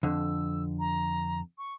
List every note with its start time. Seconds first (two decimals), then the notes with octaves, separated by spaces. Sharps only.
0.03 F2 D3 E6
0.79 A#5
1.58 C#6